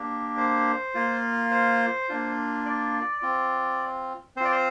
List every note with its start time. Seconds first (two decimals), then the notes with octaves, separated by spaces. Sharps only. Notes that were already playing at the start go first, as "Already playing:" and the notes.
Already playing: A#3 D4 G4
0.37 C5
0.94 A#3 F4
1.51 C5
2.09 A#3 D4 F4
2.66 D5
3.22 C4 F4
4.36 C4 C5
4.41 F4 D5
4.52 C5